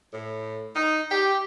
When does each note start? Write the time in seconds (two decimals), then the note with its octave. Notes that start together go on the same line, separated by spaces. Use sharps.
0.14 A2
0.75 D#4
1.11 G4